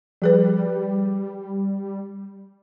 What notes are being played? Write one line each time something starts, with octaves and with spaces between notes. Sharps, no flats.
F3 G3 G#4 B4